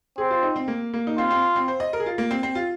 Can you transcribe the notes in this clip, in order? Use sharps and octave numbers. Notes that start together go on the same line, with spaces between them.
C4 G#4
F4
D#4
C4
A#3
A#3
D#4
C4 F4
C4
C4
C5
D#5
A#4
G#4
F4
A#3
C4
C4
F4